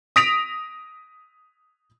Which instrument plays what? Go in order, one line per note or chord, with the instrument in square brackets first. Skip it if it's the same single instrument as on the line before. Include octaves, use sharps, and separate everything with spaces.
[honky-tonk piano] D#6 A#6 B6 D7 F7